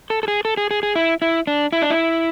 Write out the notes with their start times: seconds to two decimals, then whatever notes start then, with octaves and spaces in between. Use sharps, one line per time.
0.10 A4
0.23 A4
0.28 G#4
0.45 A4
0.57 G#4
0.71 G#4
0.83 G#4
0.95 E4
1.22 E4
1.47 D4
1.72 E4
1.82 D4
1.90 E4